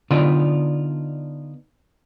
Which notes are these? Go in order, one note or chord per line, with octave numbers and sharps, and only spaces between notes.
D3 B3 D4 D#4 F4 D5